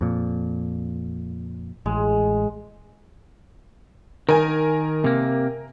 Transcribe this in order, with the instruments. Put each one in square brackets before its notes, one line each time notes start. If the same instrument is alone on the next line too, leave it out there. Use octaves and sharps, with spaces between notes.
[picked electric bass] F2 A#2
[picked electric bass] A1 [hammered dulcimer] G#3
[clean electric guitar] D#3 [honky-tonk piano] A#4 G#5
[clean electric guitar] C3 A#3